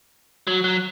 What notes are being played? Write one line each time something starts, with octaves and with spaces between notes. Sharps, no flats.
F#3
F#3